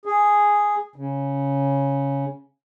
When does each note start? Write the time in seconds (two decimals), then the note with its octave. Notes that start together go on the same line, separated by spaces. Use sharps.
0.05 G#4
0.96 C#3